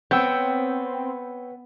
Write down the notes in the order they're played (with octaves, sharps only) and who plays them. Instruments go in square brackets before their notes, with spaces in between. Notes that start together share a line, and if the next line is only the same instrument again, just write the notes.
[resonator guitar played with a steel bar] B3 [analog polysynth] C4 [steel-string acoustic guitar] C#5 G5 [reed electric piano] E6 G6